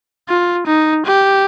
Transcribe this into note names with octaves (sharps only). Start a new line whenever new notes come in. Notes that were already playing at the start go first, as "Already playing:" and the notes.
F4
D#4
G4